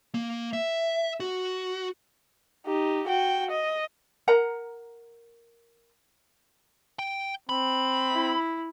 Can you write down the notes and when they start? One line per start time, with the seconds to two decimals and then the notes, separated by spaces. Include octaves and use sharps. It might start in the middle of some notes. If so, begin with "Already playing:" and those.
0.15 A#3
0.53 E5
1.20 F#4
2.66 D#4 G4
3.08 F#4 G5
3.51 D#5
4.28 A#4 F#5 A#5
6.99 G5
7.49 C4 B5
8.11 E4